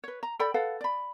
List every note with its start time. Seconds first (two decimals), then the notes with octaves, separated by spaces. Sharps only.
0.04 B4 C#5
0.23 A#5
0.39 A4 D5 G5 B5
0.54 A4 B4 F5 F#5
0.81 D5 B5